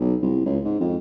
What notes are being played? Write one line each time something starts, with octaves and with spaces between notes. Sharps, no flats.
B1
C2
C#2
G#2
F2